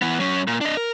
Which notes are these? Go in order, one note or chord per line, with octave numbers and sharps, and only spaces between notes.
E3 B3
F#3 C#4
A#2
D4 D#5
A#4